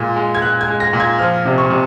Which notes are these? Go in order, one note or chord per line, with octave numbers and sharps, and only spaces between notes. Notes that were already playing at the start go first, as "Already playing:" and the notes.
Already playing: A#2 G#3
G#3
G#6
A#2 F#6
G#6
G#3
A#6
A#2
G#6
F3 F6
C3
C#6
C3